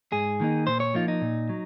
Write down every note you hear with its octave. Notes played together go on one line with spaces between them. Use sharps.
G#2 G#4
D#3 A#3 D#4
A#2 C5
C#5
F3 A#3 D#4 F4
D#4
A#2
F#3